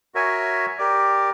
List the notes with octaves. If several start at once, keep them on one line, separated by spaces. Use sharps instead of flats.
F#4 A#4 C#5 E5 G#5
G4 A#4 D5